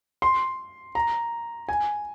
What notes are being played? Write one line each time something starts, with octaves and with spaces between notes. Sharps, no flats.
C6
A#5
G#5